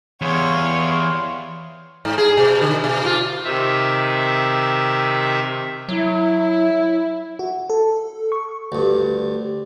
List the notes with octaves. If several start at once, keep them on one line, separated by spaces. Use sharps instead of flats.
E2 G3 C#5 F5 C6
G#2
G#4
B2
D3
B2
F4
C3 D#3 E5
F#3 E4
F#4
A4
C#6
D2 G2